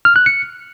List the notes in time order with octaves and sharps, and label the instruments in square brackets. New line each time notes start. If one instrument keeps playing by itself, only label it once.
[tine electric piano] F6
F#6
C#7